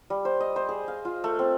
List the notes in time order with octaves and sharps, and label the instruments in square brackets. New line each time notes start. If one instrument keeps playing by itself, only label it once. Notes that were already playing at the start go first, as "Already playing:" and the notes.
[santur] G3
C5
D#5
C5
G#4
F5
F4
A3
C4